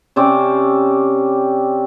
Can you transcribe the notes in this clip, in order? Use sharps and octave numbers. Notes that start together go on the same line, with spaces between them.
C3 C4 C#4 D5